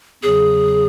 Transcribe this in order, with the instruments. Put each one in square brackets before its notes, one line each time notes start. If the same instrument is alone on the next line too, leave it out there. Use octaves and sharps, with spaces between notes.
[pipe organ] E2 C#3 F#3 [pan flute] G#4